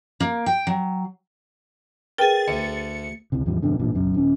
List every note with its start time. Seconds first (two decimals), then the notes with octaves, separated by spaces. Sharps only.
0.20 A#3
0.46 G5
0.67 F#3
2.18 G#4 A#4 B4 G5 A6
2.48 D2 C#7
3.32 C#2 C3
3.46 E2 A2 F3 G3
3.62 F2 G#2 B2 D3
3.79 A1 G2 A#2
3.95 F#1 B1 F#2
4.15 D#1 C#4